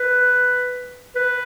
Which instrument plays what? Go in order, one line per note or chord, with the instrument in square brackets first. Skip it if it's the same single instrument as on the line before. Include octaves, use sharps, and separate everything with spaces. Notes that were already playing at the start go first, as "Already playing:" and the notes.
Already playing: [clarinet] B4
B4